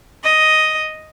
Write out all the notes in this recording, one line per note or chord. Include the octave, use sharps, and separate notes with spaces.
D#5